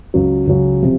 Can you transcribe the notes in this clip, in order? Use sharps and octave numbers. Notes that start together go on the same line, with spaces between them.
C#2 C#3 F#3
C#2 C#3 F#3
C3 F3